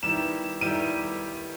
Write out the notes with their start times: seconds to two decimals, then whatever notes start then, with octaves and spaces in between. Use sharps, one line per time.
0.03 D#3 G3 B3 E4 G4 E7
0.61 D#3 G3 B3 E4 G4 D#7